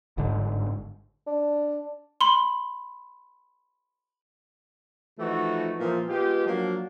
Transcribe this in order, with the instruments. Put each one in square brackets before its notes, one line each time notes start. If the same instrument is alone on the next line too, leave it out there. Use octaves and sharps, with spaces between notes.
[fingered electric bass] G1 G#2 D3
[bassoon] D4
[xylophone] B5 C6
[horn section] E3 F3 A3 D#4 F#4
A#2 E3 F3
G#3 B3 F4 G4
F3 F#3 A#3 D4